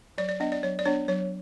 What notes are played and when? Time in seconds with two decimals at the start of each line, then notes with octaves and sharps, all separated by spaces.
0.18 F#3 D5
0.29 D5
0.40 B3 D4 D#5
0.52 D5
0.63 F#3 C#5
0.79 D5
0.86 B3 D4 C#5
1.08 F#3 C#5